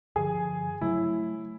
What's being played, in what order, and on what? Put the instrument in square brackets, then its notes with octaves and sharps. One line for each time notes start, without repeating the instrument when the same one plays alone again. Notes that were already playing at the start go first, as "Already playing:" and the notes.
[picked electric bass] G2 D3 F3 [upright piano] G#4
[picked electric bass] C#3 F#3 A3 [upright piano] E4